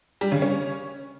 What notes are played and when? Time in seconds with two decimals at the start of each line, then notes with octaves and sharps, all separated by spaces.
0.21 G3
0.32 C#3
0.42 C#4